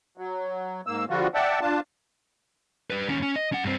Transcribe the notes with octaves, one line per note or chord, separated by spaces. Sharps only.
F#3
G#2 A#3 E6
D3 F3 G3 F4 F#4
D5 E5 F#5 G5 A5
D4 F4 A5
G3 B4
D#2 C#4
C#4
D#5
C#4 F#5
G2 C4